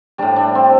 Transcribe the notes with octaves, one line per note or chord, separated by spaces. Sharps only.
A2 G3 D4
D4
C4